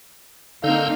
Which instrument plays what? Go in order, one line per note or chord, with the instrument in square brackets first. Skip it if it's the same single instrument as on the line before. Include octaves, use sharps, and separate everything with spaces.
[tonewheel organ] D3 E6 G6 [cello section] A#3 C4 D#4 [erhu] F5